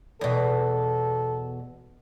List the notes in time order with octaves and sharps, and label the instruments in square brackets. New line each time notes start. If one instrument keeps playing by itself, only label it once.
[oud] E2 B2 [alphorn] A4